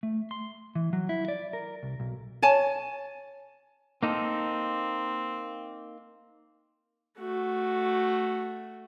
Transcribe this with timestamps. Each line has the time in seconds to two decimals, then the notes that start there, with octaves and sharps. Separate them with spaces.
0.03 A3
0.31 C6
0.75 E3
0.93 F#3
1.09 E4
1.28 D5
1.53 A#4
1.83 C2
2.00 B1
2.42 C#5 G#5 A5
4.03 A#3 C4 D#4 A4
7.18 A3 F#4